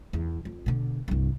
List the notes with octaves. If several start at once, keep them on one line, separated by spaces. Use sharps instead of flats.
E2
F2
B2 D3
C2 G2